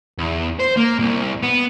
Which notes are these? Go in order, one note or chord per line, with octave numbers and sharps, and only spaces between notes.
E2
C5
A#3
C2
B3